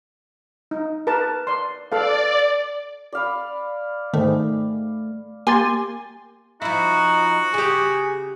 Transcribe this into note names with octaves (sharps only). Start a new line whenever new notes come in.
D#4
A#4 B4 A5
D5 C6
A4 B4 D5 F5
D5 F5 B5
G#2 D#3 A3
A#3 G4 G#5 C6 A6
F3 D#4 E4 F#4
C#3 G4 G#4